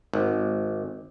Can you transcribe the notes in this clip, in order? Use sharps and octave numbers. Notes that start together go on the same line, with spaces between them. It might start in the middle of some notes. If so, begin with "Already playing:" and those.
G#1